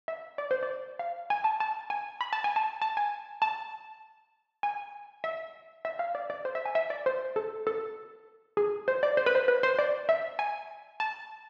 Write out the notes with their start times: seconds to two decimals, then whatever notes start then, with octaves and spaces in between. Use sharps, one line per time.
0.08 E5
0.38 D5
0.51 C5
0.63 D5
0.99 F5
1.30 G#5
1.44 A5
1.60 A5
1.90 G#5
2.21 B5
2.33 A5
2.44 G#5
2.56 A5
2.82 A5
2.97 G#5
3.42 A5
4.63 G#5
5.24 E5
5.85 E5
5.99 F5
6.15 D5
6.30 D5
6.45 C5
6.55 E5
6.65 G#5
6.75 E5
6.90 D5
7.06 C5
7.36 A4
7.67 A4
8.57 G#4
8.88 C5
9.03 D5
9.17 C5
9.26 B4
9.35 C5
9.48 B4
9.63 C5
9.79 D5
10.09 E5
10.39 G#5
11.00 A5